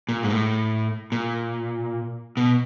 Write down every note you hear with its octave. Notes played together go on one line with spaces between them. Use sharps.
A#2
G#2
A2
A#2
B2